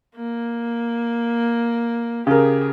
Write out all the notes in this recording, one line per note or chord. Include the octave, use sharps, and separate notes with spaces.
A#3
C#3 G4 G#4 A#4